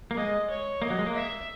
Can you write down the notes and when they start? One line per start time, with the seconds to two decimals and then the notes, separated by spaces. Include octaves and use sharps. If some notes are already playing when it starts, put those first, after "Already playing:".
0.11 A#3
0.17 G#3 D#5
0.50 C#5
0.82 A#3 D#5
0.90 F#3
0.99 G#3
1.06 A#3
1.15 E5